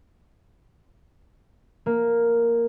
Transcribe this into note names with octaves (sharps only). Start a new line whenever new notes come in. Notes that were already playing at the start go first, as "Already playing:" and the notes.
A#3